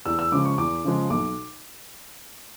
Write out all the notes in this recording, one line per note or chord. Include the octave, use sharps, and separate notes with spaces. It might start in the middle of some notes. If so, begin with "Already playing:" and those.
E2 E6
E6
C#3 F3 G#3 D6
C#6
E2 D6
C#3 F3 G#3
B1 D6